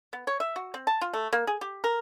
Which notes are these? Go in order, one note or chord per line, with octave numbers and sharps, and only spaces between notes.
B3
C#5
E5
F#4
C4
A5
F4
A3
A#3
G#4
G4
A#4